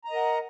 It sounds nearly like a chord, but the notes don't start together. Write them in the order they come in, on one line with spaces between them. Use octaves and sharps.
A#5 D#5 A#4 F#5